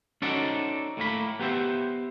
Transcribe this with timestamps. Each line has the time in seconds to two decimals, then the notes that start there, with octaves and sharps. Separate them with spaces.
0.22 C#4 D#4 F#4 A4 C5 D5
0.97 A2 A3 A#3 B5
1.39 B3 G4 C5 E5